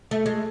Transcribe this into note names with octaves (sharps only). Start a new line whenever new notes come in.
A3
G#3